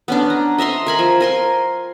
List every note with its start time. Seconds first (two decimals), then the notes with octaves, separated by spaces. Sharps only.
0.08 B3 C#4 D4
0.30 A#5
0.58 D#5 E5 A#5 C6
0.87 A#4 G#5 B5
0.99 F3
1.20 A#4 G#5 C6